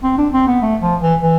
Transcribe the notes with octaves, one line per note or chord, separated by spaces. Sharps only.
C4
D4
C4
B3
A3
F3
E3
E3